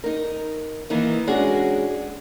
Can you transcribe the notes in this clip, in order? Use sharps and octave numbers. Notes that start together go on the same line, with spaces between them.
D#4 A#4
D#3 E3 A#3 D#4
G#3 C#4 D4 F#4 G#4